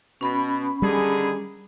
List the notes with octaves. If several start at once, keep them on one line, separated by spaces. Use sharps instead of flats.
B2 C#4 B5
D3 D#3 G3 G#4